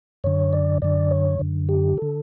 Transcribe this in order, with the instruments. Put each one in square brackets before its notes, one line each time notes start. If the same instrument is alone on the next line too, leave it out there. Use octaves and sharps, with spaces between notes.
[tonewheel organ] F#2 D3 C#5
D5
F#2 D3 D5
C#5
F#2 D3
G4
D3 A4